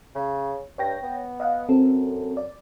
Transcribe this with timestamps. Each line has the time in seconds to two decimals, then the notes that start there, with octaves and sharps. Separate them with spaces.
0.15 C#3
0.78 G2 C#5 G5 A#6
1.03 B3
1.40 D#5 F5 F#5
1.69 F#2 C4 A4
2.37 D5